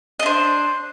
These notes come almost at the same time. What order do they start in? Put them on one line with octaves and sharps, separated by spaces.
D#5 D4 C5